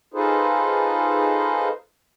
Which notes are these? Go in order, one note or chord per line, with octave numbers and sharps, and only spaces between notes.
D#4 F4 G#4 A4 B4 C5